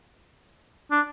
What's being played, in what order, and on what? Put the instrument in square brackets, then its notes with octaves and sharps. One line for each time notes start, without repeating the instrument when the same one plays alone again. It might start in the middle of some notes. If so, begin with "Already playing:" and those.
[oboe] D4